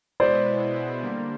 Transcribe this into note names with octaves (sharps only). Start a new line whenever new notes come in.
B2 G#3 B3 E4 C5 D5
D3 G3 A#3